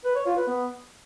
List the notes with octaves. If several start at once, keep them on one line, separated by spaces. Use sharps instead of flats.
B4
C#5
F4
B4
B3